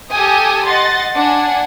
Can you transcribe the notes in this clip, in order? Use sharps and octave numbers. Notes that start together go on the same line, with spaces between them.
G4 A4 G5 G#5 D#6
D#5 F#5 C6 A6
D4 F#5 G#5